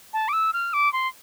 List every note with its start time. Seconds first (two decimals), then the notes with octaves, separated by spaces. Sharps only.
0.13 A5
0.28 D6
0.33 E6
0.53 F6
0.73 D6
0.93 C6